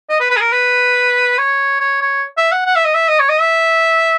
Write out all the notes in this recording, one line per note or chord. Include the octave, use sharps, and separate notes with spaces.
D#5
B4
B4
G#4
A#4
B4
C#5
C#5
C#5
E5
F#5
F#5
E5
D#5
E5
D#5
C#5
D#5
E5